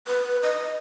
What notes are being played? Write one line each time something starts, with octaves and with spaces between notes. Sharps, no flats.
B4
D#5